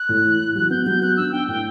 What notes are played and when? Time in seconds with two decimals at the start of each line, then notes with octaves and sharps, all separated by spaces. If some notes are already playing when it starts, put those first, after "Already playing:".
Already playing: F#6
0.09 A2
0.24 E3
0.40 E3
0.55 F#3 F#6
0.70 B3 G6
0.86 F#3 G6
1.02 B3 F#6
1.17 D4 E6
1.32 D4 G5
1.48 A2 G5